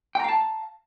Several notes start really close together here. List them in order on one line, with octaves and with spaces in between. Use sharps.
G5 A#5 F5 A5